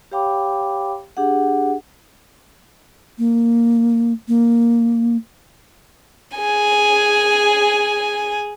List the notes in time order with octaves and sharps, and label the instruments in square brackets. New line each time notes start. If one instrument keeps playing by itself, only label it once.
[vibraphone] G4 C#5 F5 G5 B5 D6
D4 G4 G#4 F#5
[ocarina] A#3
A#3
[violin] G#4 G#5